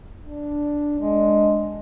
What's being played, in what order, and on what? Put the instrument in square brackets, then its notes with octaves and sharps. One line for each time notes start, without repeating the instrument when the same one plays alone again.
[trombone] D4
[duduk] G#3 [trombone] D4